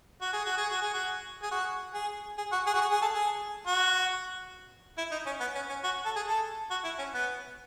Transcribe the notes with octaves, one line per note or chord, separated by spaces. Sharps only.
F#4
G#4
F#4
G#4
F#4
G#4
F#4
G#4
F#4
G#4
G#4
F#4
G#4
F#4
G#4
G#4
A4
G#4
F#4
E4
D#4
C#4
B3
C#4
C#4
F#4
A4
G#4
A4
F#4
E4
C#4
B3